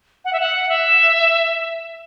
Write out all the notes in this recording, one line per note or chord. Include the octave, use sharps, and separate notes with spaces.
F#5
E5
F#5
E5